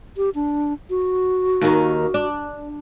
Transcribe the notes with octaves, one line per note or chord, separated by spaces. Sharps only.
G4
D4
F#4
D#2 D#3
D4